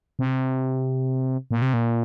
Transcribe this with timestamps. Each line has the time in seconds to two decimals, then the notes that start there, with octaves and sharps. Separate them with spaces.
0.19 C3
1.51 A#2
1.62 C3
1.74 A#2